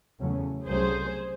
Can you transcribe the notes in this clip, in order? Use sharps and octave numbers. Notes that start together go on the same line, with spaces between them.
E2 C#3 F#3 A3 C#4
C2 C3 F#3 A3 C#4 G#4 C5